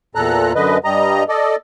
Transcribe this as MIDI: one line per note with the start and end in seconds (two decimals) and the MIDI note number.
0.15 0.53 40
0.15 0.53 46
0.15 0.53 69
0.15 0.53 82
0.15 0.53 90
0.55 0.77 42
0.55 0.77 50
0.55 0.77 71
0.55 0.77 75
0.84 1.23 43
0.84 1.23 55
0.84 1.23 75
0.84 1.23 82
1.29 1.56 69
1.29 1.56 74
1.29 1.56 75